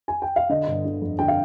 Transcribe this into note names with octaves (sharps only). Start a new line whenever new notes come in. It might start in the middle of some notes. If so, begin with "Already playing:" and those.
G#5
G5
F5
D3 D#5
G1
D3
F2
D3 G5
F5